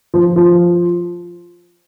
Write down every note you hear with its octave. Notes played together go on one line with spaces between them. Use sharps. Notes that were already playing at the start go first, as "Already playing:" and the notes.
F3
F3